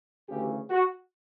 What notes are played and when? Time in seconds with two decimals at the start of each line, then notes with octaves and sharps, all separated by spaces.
0.29 D2 C#3 E3 G4
0.70 F#4